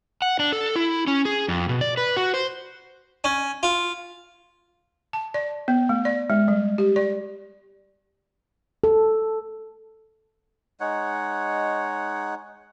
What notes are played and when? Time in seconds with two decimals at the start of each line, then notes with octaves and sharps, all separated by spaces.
0.22 F#5
0.40 D4
0.52 A4
0.76 E4
1.07 C#4
1.25 G#4
1.48 F2
1.69 B2
1.81 D5
1.97 B4
2.16 F#4
2.34 C5
3.24 C#4
3.63 F4
5.13 A5
5.34 D5
5.68 B3
5.89 A3
6.05 D5
6.30 G#3
6.48 G3
6.78 G4
6.96 D5
8.84 A4
10.80 G#3 D#4 C#5 F#5